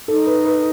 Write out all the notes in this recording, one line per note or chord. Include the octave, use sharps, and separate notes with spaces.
D#4 A4
B4
B4